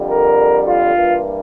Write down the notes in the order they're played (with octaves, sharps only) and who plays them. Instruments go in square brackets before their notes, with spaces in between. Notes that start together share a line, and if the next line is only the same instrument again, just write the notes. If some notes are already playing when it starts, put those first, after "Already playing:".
Already playing: [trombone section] F2 D3 G3
A#4
F4
G2 E3 A#3